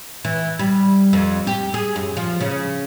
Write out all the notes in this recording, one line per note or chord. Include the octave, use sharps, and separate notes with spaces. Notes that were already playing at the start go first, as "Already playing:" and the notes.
E3
G3
F2
G4
G#4
F#2
F3
C#3